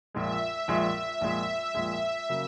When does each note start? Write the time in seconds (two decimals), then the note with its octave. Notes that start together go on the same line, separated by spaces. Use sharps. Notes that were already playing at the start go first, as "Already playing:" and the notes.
0.14 A#1 A#2 G#3 E5
0.68 A#1 A#2 G#3
1.21 A#1 A#2 G#3 E5
1.75 A#1 A#2 G#3
2.29 C#3 F#3 A#3